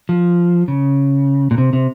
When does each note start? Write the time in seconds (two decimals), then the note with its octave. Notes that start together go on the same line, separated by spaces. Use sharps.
0.09 F3
0.68 C#3
1.51 A#2
1.58 C3
1.73 C3